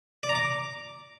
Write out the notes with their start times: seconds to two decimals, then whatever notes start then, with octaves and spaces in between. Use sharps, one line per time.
0.23 D5
0.29 A#5
0.35 D6